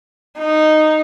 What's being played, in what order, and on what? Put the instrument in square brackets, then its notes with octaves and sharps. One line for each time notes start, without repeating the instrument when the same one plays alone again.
[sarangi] D#4